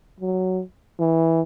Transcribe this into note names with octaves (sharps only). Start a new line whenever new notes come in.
F#3
E3